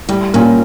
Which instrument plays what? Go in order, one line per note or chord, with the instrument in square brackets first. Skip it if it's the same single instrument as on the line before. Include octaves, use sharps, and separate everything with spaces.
[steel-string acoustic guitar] A2 [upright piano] G3
[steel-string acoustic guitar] A#2 [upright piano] A#3 C#4 F4